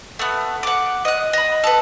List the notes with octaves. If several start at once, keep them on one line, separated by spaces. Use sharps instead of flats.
A3 B3
F#5 D6
D#5 F#6
D#5 B5
A4 B4